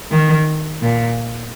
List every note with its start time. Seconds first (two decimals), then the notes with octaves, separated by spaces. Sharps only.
0.11 D#3
0.82 A#2